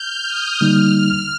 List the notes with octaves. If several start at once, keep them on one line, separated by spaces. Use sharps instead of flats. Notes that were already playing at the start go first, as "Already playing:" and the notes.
Already playing: F6 G6
D#6
D3 G3 A#3 D#4 F6
F6